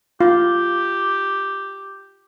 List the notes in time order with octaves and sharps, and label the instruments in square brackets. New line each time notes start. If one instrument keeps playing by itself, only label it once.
[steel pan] F4 [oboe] G4